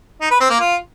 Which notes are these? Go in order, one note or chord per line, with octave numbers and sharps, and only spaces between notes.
D#4
B4
C4
A#3
F4